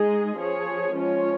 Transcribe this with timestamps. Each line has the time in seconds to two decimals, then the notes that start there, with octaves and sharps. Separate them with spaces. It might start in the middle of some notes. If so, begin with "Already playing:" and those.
Already playing: G#3 D#4 G#4 D#5
0.36 F3 C#4 G#4 C#5
0.93 F3 G#3 C#4 F4 C#5